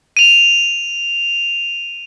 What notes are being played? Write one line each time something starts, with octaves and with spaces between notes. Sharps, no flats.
D#7 F7